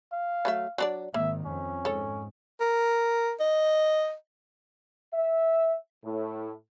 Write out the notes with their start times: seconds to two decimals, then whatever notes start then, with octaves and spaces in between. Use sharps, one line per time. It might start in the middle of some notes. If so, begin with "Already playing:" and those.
0.13 F5
0.45 F#3 A3 E5
0.78 F#3 D4 D5
1.14 G#1 D#3 A#3 E5
1.45 F2 C#4
1.85 G#2 A4 C#5
2.60 A#4
3.40 D#5
5.13 E5
6.04 A2